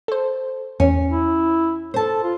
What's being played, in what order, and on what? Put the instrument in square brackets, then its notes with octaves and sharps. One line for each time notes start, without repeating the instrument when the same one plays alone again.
[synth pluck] A4 C5
[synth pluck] E2 [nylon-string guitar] C#4
[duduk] E4
[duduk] A4 [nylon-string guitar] C5 A5
[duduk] F4